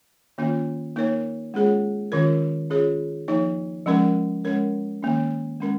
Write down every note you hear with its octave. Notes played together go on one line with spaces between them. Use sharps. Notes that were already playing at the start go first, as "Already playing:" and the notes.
D#3 A#3 C#4 F4
A#3 D#4 A#4 C#5
G#3 C#4 F4 G#4 C#5
D#3 C#4 F4 A#4
C#4 F4 G#4 C#5
F3 A#3 D#4 C#5
F3 G#3 C#4 A#4
G#3 C#4 A#4 C#5
D#3 A#3 C#4
G#3 C#4 A#4